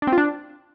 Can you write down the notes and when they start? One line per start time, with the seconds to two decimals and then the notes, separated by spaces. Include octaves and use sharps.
0.02 D4
0.07 C4
0.12 F4
0.18 D4